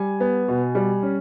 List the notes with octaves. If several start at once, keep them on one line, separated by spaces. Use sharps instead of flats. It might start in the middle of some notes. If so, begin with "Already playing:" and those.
Already playing: G3 G#5
B3
B2
G3
C#4